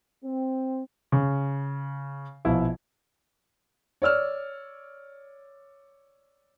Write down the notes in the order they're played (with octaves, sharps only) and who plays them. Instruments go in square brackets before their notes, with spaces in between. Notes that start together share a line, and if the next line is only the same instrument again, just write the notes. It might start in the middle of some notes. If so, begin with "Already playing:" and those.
[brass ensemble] C4
[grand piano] C#3
A#1 B2 E4 F5
[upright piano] C#5 D5 E6 F6